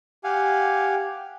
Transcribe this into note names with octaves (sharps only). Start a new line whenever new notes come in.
G4 F5 F#5 G#5